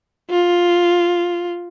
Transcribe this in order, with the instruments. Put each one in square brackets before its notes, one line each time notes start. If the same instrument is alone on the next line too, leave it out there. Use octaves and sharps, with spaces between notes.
[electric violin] F4